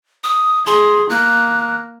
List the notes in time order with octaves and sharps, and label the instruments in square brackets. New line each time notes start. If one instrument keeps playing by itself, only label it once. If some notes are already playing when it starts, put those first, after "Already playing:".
[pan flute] D#6
[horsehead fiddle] G#4 [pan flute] C6
[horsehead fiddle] A#3 [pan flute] F#6